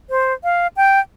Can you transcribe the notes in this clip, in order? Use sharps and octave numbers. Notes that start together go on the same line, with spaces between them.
C5
F5
G5